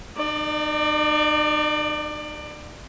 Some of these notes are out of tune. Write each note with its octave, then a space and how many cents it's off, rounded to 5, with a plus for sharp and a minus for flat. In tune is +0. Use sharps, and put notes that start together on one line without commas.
D#4 -35 D5 +20